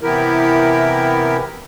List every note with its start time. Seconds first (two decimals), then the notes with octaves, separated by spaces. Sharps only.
0.01 C3 E3 B3 E4 G4 A#4